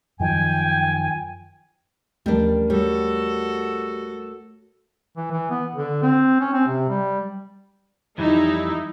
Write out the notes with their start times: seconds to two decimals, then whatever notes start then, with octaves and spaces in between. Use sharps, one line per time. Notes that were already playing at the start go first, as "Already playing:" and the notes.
0.20 F#2 D#3 F3 G5 G#5
2.26 D#2 E3 F3 G3 A3 D4 A#4
2.70 G3 F#4 A4 C#5
5.17 E3
5.31 E3
5.51 B3
5.76 D3
6.02 C4
6.40 C#4
6.53 C4
6.67 C3
6.89 G3
8.18 F2 E3 G3 D#4 E4